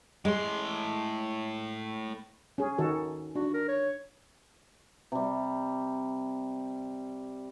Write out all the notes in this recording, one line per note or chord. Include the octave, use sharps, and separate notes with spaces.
A2 G#3 C6
C#4 G#4
D#3 F#4 A4
D4 F#4
A#4
C#5
C3 G3